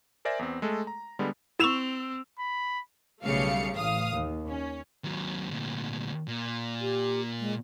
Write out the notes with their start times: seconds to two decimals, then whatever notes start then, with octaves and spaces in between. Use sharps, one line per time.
0.25 A#4 C5 D5 E5 G#5 A#6
0.39 E2 B3 C4
0.62 G#3 A3 A4
0.87 A#5
1.19 D3 G3 G#3 B3
1.60 C4 E4 C#6 E6 E7 F7
2.39 B5
3.23 B1 C#3 G3 A3 F5 C#7
3.75 A1 F5 D#6
4.14 D#2
4.50 C#4
5.04 D#2 F#3
5.51 D2 A#2
6.28 A#2
6.81 G4
7.40 G#3